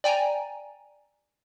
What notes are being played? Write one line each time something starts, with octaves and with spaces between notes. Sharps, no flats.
D5 G5 G#5 A#5